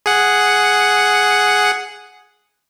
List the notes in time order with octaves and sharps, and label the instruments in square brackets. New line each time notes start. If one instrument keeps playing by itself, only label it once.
[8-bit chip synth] G#4 F#5